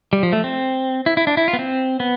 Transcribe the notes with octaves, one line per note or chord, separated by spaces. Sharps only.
G3
F3
A3
C4
E4
E4
D4
E4
F4
B3
C4
B3